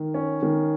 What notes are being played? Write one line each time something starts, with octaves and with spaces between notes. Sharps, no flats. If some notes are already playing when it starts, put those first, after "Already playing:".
Already playing: D#3
C#4
D#3